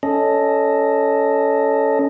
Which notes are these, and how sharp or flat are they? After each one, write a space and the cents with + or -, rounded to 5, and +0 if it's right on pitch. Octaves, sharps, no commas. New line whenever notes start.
C#4 +15 A4 +0 D#5 +0